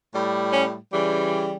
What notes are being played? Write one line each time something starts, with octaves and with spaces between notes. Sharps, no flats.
A2 G3
C#4
C#3 E3 G3